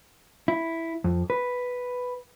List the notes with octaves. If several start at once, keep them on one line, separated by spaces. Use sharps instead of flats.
E4
F2
B4